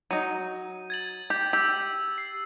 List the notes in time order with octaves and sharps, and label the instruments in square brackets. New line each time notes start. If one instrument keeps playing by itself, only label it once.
[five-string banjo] F#3 D#4 [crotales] D#7
[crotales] G#6 A6 F#7
[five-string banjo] G4
[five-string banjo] G4 [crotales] E6
[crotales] C7